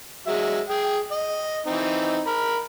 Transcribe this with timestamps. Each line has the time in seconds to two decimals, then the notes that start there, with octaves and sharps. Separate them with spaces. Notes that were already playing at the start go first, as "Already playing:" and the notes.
0.27 F#3 G#3 E5
0.69 G#4 G5
1.12 D#5
1.66 E3 C4 D#4
2.27 A#4 B5